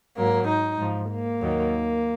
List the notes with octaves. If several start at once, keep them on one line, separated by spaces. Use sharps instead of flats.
G#2 F#3 A#3
D#4
G#2 F3
A#3
D#2 D#3 F#3